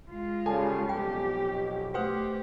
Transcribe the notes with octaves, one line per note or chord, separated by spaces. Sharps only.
G#3 F4
C#3 G3 A4 G#5 A5
B1 F2 B2 G4 G5
A3 F#4 G4 B4 C5 F#5 D#6